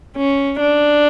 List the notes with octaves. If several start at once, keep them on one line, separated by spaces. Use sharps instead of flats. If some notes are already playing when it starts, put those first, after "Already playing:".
C#4
D4